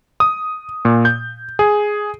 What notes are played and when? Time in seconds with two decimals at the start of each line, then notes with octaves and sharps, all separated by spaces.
0.20 D#6
0.85 A#2
1.05 G6
1.59 G#4